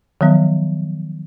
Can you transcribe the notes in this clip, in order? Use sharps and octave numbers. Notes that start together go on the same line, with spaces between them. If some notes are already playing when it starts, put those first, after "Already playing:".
D#3 F3 F#3 B3